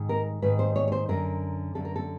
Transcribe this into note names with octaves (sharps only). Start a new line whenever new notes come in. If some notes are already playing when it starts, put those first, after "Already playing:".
Already playing: G#2 D#3
A#4
G#2 D#3 B4
C5
C#5
C#5
C5
F#2 D3 A#4
F#2 D3 A4
A#4
A4